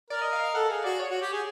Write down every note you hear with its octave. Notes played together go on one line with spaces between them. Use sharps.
A#4 D5
D#5
F5
F5
A4 F#5
G#4 F5
F#4 D5
C#5
F#4
G4
G#4